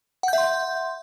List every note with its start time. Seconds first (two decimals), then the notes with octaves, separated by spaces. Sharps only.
0.23 F#5
0.28 G6
0.33 E5
0.38 C6